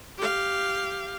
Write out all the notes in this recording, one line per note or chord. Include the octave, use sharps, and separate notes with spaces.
G4 F5